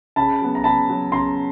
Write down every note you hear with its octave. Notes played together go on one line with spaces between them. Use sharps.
C#3 A5 B5
F#3 B3
A#5
C#3 A5 B5
F#3 B3
C#3 A#5 C6